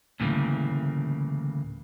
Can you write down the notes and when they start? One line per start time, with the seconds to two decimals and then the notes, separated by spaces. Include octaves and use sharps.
0.20 D2 A2 C#3 E3 G3 A#3